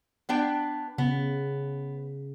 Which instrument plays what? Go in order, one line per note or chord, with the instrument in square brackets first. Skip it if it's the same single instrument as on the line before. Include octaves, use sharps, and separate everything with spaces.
[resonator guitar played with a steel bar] B3 D4 G5
[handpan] C#3 [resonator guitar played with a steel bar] B3